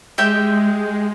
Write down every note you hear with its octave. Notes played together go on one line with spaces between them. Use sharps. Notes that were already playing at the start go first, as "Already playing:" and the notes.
G#3 G4 E5 G5